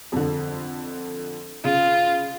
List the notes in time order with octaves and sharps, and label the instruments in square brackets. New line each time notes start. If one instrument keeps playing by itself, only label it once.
[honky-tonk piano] F2 D3
[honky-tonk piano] C#3 [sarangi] F4